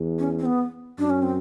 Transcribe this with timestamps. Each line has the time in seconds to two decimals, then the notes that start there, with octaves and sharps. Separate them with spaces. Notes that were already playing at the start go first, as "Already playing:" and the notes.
Already playing: E2
0.19 C#4
0.39 C4
0.46 B3
0.99 F#2 D4
1.10 C#4
1.23 C4